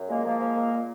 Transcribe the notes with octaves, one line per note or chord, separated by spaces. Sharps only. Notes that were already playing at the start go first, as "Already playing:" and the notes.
Already playing: F#2
A#2 G#3 A#3
F3 G#3 A#3
F3
A#2
A#2